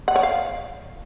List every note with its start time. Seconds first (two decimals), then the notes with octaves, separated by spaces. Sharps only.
0.08 F#5
0.16 C#5
0.23 F5